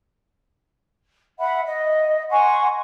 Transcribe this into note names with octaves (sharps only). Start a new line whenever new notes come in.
E5 F#5 B5
D#5
F#5 G#5 C6 C#6